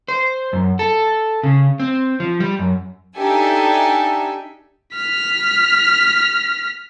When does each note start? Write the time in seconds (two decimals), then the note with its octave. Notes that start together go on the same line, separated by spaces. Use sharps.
0.08 C5
0.53 F#2
0.79 A4
1.43 C#3
1.80 C4
2.20 F3
2.40 G3
2.59 F#2
3.17 D4 D#4 G4 A4 E5 G#5
4.94 F6 B6